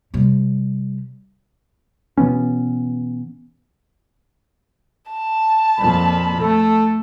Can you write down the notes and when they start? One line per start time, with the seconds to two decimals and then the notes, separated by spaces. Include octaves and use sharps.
0.14 C3 G3
2.18 B2 E3 B3 C#4
5.12 A5
5.78 F2 A#2 B5
6.40 A3 A4